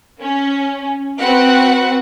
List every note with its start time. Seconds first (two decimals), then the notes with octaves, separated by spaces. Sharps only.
0.21 C#4
1.20 C4 F#4 B4 F#5